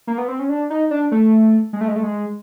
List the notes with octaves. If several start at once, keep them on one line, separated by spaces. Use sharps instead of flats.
A#3
B3
C4
C#4
D4
D#4
D4
A3
G#3
A3
G#3
A3
G#3